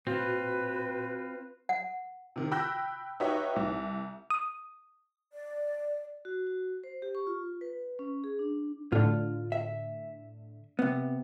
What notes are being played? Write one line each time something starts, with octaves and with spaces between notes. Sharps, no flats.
A#2 C4 F4 F#4 B4
F#5
C3 D#3
G5 B5 E6 F#6 G6 A#6
D#4 F#4 G4 B4 C#5 E5
C2
D#6
D5
F#4
F#4
C5
G4
C#6
F4
B4
C#4
G#4
D4
A2 D3 F4
E5
C3 B3